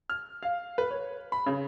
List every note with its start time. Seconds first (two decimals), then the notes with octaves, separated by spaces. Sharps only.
0.10 F6
0.43 F5
0.78 B4
0.91 C#5
1.32 B5
1.46 C#3